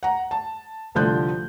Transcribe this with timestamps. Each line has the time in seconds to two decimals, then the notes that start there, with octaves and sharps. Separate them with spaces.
0.03 F#5 A#5
0.31 A5
0.95 C2 A2 D3 F3 F#6 G6